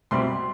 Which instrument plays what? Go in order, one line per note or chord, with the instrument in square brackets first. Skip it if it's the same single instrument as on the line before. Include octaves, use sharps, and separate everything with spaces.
[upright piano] C2 B2 G3 C4 C6